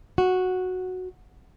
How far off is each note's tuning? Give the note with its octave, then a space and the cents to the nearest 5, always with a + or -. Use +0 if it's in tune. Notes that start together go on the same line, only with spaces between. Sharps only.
F#4 -5